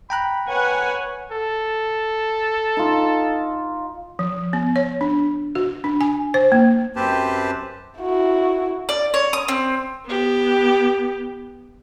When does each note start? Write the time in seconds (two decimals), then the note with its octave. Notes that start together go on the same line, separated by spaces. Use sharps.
0.10 G5 A#5 B5 F#6
0.49 B4 C#5 F#5 G#5
1.31 A4
2.77 D#4 F4
4.19 F3
4.53 B3
4.76 C#5
5.01 D4
5.55 F#4
5.84 D4
6.01 G#5
6.34 C5
6.52 A#3
6.96 F#2 C4 G4 B4 C5 A5
7.99 E4 F#4
8.89 D5
9.14 C#5
9.33 D#6
9.48 C4
10.06 B3 G4